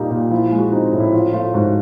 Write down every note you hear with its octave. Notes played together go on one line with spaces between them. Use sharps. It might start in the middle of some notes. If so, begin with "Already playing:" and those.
Already playing: A#2 G3 A#3 D#4 G4
A#2
F3 E4
F4
G#3
F#4
C4 D#4
A2
E4
F3 F4
A3 F4
G#2 F#4